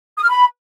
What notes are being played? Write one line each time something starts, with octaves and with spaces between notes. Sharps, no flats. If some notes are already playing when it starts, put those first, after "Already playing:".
D#6
F6
B5